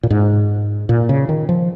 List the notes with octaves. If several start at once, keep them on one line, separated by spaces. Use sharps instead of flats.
A#2
G#2
A#2
C#3
D#3
F3